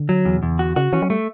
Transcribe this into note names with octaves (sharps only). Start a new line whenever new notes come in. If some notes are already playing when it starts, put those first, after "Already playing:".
Already playing: D3
F#3
E2
B2
E2
C#3
D3 F#4
C#3 F#4
E3 C#4
F#3
G3 A3